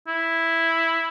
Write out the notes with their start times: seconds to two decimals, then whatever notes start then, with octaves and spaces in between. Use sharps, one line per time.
0.08 E4